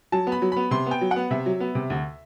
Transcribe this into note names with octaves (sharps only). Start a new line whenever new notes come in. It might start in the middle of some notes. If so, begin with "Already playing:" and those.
F#3 A5
B3
B5
F#3
B3 B5
C3 C6
B3 G5
F#3
F#5
B3
C3 E5
F#3
B3
C3
D2